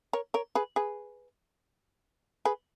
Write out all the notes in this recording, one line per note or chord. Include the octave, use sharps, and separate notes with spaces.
A#4 C#5
A#4 C#5
G#4 B4
G#4 B4
G#4 B4